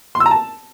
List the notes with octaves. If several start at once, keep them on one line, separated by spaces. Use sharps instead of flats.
C6
E6
A#5
A5